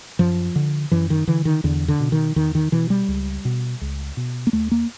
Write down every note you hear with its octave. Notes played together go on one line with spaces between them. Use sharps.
F#2 F3
D3
F#2 E3
D#3
D3 E3
D#3
E2 D3
D3
B2
D#3
E2 D#3
D#3
B2 E3
G3
C#2
B2
C#2
B2
A#3
D#2 A3
A#3